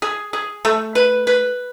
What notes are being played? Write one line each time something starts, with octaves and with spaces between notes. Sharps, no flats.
G#4
G#4
A3
B4
B4